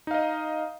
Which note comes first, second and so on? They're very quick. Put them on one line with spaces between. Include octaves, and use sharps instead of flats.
D#4 F5 D#5